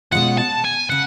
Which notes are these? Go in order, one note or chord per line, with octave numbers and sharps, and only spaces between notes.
B2 G#3 C#4 F4 F#5
A5
G#5
C#3 F#5